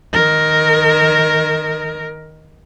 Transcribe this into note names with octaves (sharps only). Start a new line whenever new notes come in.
D#3 A#4